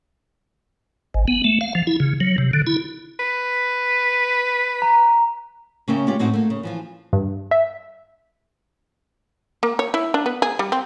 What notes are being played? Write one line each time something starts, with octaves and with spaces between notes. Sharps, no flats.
G#1
B3
A3
F5
F3
E4
C#3
F#3
C3
D3
E4
B4
A#5
C#3 A#3 C#4 E5 G5
G#3 C#4 F4 G4 D5
A2 C4 D#4 F#4
A3 A#3
C#3
E3 F3 F4
G2
E5
A#3
C#5
E4
D4
B3
G#4
G3
C4